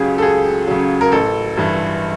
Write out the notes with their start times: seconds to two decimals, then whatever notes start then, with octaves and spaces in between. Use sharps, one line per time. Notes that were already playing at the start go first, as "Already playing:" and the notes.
Already playing: C#2 C#3 F#3 G4 G#4
0.18 A4
0.22 C#2 G#4
0.67 C#3 F#3
1.01 A#4
1.12 A1 A4
1.57 G2 E3